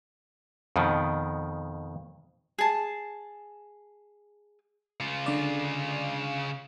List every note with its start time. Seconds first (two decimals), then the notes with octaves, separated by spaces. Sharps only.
0.76 F2 B2 D#3
2.58 G#4 A5
5.00 C#3 F4
5.26 D3 D5